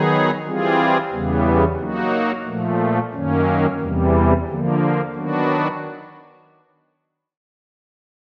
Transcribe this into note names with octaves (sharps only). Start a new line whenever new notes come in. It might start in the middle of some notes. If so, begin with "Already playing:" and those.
Already playing: D#3 F#3 B3 D#4 G#4
E3 G3 C4 F4 G#4
E2 C#3 E3 G3 B3
F#3 A#3 D#4 F#4
A#2 F3 A3
F#2 D#3 F#3 A#3 C#4
E2 C3 E3 G3
D3 F3 A#3
D#3 F#3 B3 D4 F#4